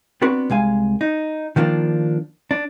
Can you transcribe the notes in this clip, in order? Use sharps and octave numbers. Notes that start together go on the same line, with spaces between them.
B3 C4 D4 F#4 B4
C2 G#3 F5 G#5
D#4
D#3 F3 A#3 B3 D4
D4